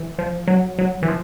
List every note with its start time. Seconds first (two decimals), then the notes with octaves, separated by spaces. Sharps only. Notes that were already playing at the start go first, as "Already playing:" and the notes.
Already playing: E3
0.19 F3
0.48 F#3
0.79 F#3
1.03 E3
1.08 F3